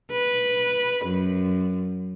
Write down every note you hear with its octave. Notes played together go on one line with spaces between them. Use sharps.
B4
F#2